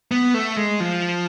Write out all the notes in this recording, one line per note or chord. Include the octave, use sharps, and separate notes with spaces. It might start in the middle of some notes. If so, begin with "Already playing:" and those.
B3
A3
G#3
F3